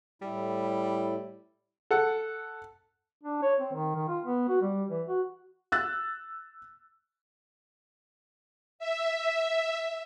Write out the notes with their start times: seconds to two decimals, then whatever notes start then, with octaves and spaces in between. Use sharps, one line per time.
0.22 A2 G3 E4
1.91 A4 F#5
3.23 D4
3.43 C#5
3.60 C4
3.73 D#3
3.95 D#3
4.08 F4
4.25 B3
4.48 F#4
4.62 G3
4.90 E3
5.08 F#4
5.72 E6 F#6 A6
8.79 E5